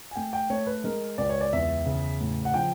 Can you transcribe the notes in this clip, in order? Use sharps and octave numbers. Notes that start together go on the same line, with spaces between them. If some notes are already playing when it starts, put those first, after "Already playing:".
G#5
A3 G5
G5
A3 C#5
B4
G#3 A#4
C#2 D5
C#5
D5
E2 E5
C#3
A2
F#5
F3 G5